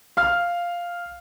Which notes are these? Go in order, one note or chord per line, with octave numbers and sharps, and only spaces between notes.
F5 F6